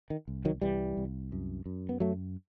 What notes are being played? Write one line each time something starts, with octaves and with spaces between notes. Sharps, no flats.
D#3
C2
D#3 F#3
C2 E3 G3
C2
F#2
F#2
B3
F#2 F#3 A3